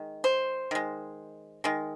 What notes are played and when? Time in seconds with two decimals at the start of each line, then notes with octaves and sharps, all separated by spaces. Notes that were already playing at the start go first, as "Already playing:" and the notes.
Already playing: D#3 G#3
0.24 C5
0.71 D#3 G#3
1.64 D#3 G#3